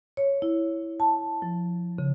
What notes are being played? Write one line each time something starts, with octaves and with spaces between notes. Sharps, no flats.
C#5
E4
A5
F3
C#3